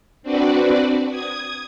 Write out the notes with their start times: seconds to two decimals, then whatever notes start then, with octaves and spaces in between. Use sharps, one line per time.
0.23 C4 D4 F#4 B4 D5
1.10 D#6 G#6